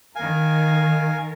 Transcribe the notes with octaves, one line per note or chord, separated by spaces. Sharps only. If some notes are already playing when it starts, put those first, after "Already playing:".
D#3 A#4 F5 G#5